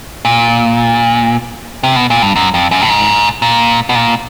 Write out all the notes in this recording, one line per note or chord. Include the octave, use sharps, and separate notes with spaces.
A#2
C3
B2
A#2
G2
F#2
F2
F#2
A2
G#2
A#2
B2
A#2